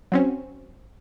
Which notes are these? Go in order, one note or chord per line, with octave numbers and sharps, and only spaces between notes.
F#3 C4 C#4